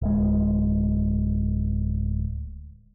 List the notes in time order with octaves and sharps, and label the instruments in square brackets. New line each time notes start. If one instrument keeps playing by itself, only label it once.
[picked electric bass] D1 G#3